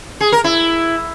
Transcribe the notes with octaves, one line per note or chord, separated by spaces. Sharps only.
G#4
A#4
E4